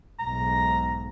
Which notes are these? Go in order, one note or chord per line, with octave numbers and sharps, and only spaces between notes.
B1 G#2 A#5